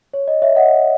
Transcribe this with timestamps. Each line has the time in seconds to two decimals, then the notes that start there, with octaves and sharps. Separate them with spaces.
0.13 C#5
0.28 D#5
0.42 C#5 E5
0.56 D#5 F#5